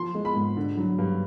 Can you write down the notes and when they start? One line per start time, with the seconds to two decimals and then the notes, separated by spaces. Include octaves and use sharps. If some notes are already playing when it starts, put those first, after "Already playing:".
Already playing: F3 C6
0.15 G#3
0.25 B5
0.36 G#2
0.57 D3
0.77 F#3
0.99 G2